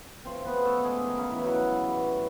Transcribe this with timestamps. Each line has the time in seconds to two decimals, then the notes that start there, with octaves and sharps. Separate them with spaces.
0.25 C#3 F3 A3 C4 C5
0.45 B3 B4
0.57 G#4
0.65 A3 A4
0.77 A4
0.85 G#3 G#4
0.95 D4
1.05 D#3 D#4
1.18 C#3 C#4
1.31 E3 E4
1.44 F#3 F#4
1.84 A2 E3 G3